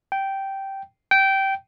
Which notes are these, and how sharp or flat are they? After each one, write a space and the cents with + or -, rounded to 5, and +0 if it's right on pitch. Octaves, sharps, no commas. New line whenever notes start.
G5 -10
G5 -15